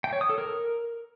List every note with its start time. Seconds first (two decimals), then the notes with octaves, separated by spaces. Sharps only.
0.04 G5
0.13 C#5
0.21 D#6
0.30 A4
0.38 A#4